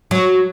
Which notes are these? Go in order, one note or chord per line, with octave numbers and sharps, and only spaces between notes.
F#3